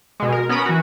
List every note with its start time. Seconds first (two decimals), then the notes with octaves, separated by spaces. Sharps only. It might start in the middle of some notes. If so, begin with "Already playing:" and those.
0.20 B2 G#3
0.32 A#4
0.49 B3 C#4 A#4 A#5 B5
0.66 E3 F#4